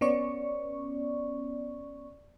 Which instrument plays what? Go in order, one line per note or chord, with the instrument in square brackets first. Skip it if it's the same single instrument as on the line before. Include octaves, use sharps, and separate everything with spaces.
[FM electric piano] B3 C#4 D5 C#6